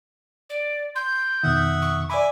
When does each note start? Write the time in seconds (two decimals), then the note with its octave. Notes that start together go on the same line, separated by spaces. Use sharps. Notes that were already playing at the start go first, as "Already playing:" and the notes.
0.50 D5
0.96 C6 G6
1.43 F2 B2 D#3 E5 F#5 D#6
1.82 C#6
2.10 D5 E5 G#5 B5 D6